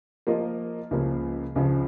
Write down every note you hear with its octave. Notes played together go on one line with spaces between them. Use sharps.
F3 A#3 F4 A#4 D#5
C#2 C#3 F3 A#3
C#2 C#3 F3